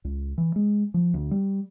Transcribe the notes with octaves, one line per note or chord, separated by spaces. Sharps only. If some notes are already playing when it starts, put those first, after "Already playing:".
C#2
E3
G#3
F3
D2
G3